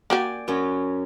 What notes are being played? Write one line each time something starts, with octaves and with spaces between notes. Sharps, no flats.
A#3 F#4 G4 D5 G5 G#5
F#2 F#3 C#4